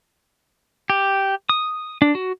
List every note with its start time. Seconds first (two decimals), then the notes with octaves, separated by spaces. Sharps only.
0.90 G4
1.49 D#6
2.02 D4
2.15 F#4